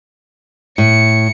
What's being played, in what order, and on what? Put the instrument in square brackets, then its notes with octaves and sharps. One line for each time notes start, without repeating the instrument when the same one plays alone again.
[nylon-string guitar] A2 [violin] C#7